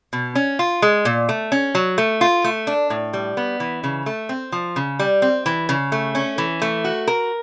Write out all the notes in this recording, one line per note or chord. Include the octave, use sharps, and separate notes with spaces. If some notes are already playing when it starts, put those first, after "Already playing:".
B2
C#4
F4
G#3
A#2
A3
C#4
F#3
A3
F4
A3
D4
A2
G3
B3
E3
C#3
A3
C4
F3
C#3
G3
C4
E3
C#3
A3
C#4
E3
A3
F#4
A#4